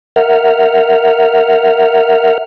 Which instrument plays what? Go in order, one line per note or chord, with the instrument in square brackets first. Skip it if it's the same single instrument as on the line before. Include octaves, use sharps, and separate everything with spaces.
[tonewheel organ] A#4 E5 F#5 F6